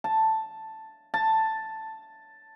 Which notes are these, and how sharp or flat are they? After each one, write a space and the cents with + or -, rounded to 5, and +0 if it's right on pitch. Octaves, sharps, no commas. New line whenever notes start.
A5 +5
A5 +5